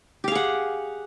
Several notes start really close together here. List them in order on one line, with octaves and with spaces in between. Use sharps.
G4 F5 G#4 F#5